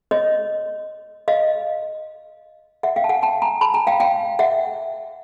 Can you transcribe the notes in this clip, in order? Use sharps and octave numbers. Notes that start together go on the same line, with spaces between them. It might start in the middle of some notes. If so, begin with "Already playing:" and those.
C#5 D#5
D#5 F5
E5 F#5
F5 G5
A5
F#5 G#5
G5 A5
G#5 A#5
A5 B5
G#5 A#5
F5 G5
F5 G5
E5 F#5